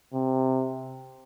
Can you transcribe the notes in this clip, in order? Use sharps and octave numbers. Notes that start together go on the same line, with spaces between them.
C3